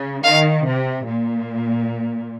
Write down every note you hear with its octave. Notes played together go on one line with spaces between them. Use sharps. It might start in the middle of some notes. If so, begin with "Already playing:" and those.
Already playing: C#3
D#3 F5
C3
A#2